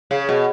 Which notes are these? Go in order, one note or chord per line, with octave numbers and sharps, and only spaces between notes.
C#3
B2